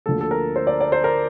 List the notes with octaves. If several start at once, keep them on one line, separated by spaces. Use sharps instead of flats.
D2 D3 F3 A#3 A4
A4
A#4
C5
D5
D5
C5
A#4